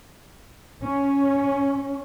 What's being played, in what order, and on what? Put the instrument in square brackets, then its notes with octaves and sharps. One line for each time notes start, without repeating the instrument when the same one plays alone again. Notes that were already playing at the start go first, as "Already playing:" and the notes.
[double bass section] C#4